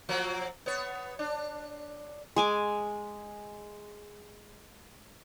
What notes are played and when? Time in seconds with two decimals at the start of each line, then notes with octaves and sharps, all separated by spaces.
0.09 F3 F#3 A#3
0.66 B3 C#5
1.19 D4
2.36 G#3 G#5 D6